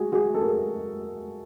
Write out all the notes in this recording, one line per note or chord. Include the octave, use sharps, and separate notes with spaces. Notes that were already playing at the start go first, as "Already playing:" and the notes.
Already playing: F#4 G#4
F#4 G#4
A4
G#4 A#4